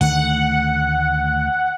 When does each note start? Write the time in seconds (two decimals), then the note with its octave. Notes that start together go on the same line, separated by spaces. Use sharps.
0.01 D2 D#3 A3 F#5